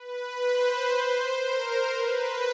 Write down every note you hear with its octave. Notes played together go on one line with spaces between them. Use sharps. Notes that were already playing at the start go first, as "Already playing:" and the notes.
Already playing: B4
C5
A#4
B4